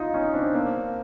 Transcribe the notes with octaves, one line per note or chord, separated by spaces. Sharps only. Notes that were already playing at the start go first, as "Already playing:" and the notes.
Already playing: D#4 F4
C#4 D#4
C4 D4
A#3 C4